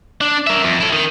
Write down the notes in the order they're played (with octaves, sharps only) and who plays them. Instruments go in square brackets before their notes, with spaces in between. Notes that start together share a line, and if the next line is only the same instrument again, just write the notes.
[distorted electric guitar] D4
A#4 E5
F2
E4 A4
D#3